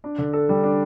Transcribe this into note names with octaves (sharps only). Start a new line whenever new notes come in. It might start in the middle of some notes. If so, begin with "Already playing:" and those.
D4
D3
A4
G3
D4